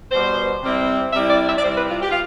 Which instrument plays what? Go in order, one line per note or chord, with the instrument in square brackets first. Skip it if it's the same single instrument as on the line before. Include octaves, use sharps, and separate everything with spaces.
[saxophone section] B2 G3 B3 C5
C3 G3 C4 E4
C3 G3 C4 E4 E5
D5
E5
D5
C3 G3 C4 E4 C5
B4
F4
G4
F4